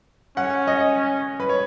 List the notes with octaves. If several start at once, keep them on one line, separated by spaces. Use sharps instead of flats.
C#4 F#5
D#5
B4
C#5